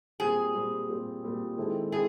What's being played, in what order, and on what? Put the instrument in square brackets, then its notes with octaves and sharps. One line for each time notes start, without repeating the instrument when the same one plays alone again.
[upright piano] A#2 G3 C4 [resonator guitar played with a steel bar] G#4
[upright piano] A#2 G3 C4
A#2 G3 C4
A#2 G3 C4
D#3 G#3 C4 E4 A4
[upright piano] D#3 G#3 C4 E4 A4 [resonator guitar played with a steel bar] G#4